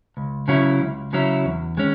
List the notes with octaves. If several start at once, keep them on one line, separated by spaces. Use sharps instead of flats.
C#2
C#3 F#3 C#4 E4
C#2
C#3 F#3 C#4 E4
E2
D#3 G#3 C#4